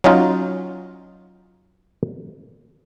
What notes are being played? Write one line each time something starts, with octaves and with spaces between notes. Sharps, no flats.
F#3 C#4 D#4 F4